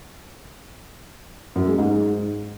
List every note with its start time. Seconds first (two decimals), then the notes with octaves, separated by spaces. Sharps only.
1.55 F#2
1.67 G#3
1.78 G#2